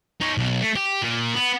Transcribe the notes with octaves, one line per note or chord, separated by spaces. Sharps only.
D#4 C#5
B1
A3
G4
A#2
B3